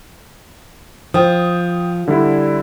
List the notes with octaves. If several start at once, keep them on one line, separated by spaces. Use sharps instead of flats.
F3 G5 D#6
D3 G3 E4